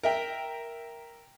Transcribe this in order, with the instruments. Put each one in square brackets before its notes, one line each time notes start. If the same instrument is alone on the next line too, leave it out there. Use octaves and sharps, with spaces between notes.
[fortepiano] A#4 E5 G5